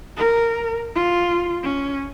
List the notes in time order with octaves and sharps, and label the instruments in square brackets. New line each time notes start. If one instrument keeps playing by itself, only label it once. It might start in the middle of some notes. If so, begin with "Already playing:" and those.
[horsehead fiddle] A#4
F4
C#4